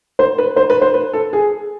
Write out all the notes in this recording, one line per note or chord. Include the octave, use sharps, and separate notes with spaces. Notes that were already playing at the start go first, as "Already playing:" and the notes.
C5
B4
C5
B4
C5
B4
A4
G#4